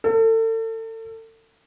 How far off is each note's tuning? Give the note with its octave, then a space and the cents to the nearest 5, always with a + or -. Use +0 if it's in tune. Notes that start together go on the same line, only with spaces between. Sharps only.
A4 +35